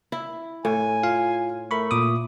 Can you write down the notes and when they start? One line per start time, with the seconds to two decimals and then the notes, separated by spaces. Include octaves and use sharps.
0.12 E4
0.65 A2 G#5
1.03 F4 F5
1.71 A3 A#4 B5 C#6
1.91 A#2 D6 D#6